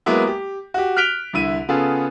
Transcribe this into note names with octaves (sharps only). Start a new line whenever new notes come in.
F#3 G#3 A#3 B3 E4
G4
F#4 G4
F6 F#6 B6 D7 F7 G7
C2 D3 E4 D#7
C#3 B3 F4 G#4 A4